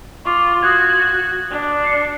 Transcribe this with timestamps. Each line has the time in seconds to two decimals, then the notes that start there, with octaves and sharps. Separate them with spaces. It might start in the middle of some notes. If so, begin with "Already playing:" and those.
0.25 F4 C#6 D6
0.62 F#4 D#6 F#6 G#6
1.50 D4
1.84 C7 C#7